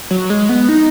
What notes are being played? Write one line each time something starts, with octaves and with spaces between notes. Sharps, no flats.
F#3
G#3
B3
D#4